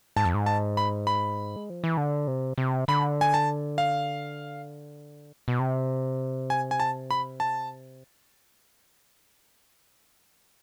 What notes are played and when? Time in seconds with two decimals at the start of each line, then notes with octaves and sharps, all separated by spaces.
0.16 G#2 A5
0.25 F2
0.34 G#2
0.46 A5
0.77 B5
1.07 B5
1.56 G#3
1.70 F3
1.84 E3
1.97 D3
2.27 C3
2.58 C3
2.88 D3 B5
3.21 G#5
3.34 A5
3.78 F5
5.48 B2
5.59 C3
6.50 G#5
6.71 G#5
6.80 A5
7.11 B5
7.40 A5